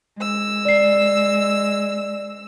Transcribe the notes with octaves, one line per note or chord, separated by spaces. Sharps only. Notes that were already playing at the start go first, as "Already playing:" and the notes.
G#3 E6
D5 C7